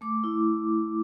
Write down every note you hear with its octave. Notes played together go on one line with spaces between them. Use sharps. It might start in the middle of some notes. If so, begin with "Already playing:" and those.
A3 D6
E4